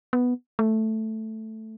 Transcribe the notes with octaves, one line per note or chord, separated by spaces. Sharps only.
B3
A3